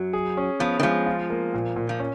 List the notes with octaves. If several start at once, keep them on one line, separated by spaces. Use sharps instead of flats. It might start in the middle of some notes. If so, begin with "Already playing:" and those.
Already playing: F#2 F#3
G#4
C#4
F3 B3
D#3
F3 G#3
F4
A#3
A#2
A#2
F3
C#4